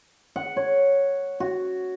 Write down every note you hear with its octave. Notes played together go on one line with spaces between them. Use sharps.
F#5
C#5
F#4